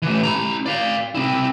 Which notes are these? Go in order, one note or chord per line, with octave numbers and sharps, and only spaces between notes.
E3 A3
E4 A#5
D5 F5
C4 E4